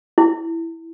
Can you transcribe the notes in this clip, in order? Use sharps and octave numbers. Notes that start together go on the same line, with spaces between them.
E4